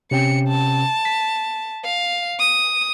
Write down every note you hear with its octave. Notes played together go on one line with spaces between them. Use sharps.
C3 C#4 G5 C#7
A5
B6
F5
D#6